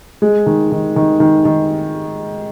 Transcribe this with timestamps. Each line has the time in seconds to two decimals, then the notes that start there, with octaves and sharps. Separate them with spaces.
0.22 G#3
0.46 D#3
0.72 D#3
0.96 D#3
1.20 D#3
1.45 D#3